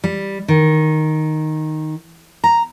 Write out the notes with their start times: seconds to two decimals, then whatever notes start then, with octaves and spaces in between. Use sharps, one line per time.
0.04 G3
0.48 D#3
2.44 A#5